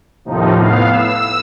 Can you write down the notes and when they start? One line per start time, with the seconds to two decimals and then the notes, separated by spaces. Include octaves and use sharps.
0.25 D#2 A2 C3 F3 D#4
0.54 A2 B3 F5
0.90 E6